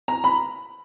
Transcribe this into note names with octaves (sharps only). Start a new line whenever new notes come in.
A#5
B5